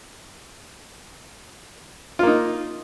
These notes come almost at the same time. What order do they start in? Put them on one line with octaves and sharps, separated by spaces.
F4 A#3 D#4